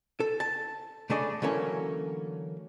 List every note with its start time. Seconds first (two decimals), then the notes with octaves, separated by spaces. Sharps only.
0.20 A4
0.40 A5
1.10 C#3 A3 D4 G#4 D5 D#5
1.42 D3 E3 F#3 A3 A#3 C#4